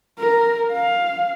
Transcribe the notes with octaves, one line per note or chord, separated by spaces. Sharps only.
A#4
F5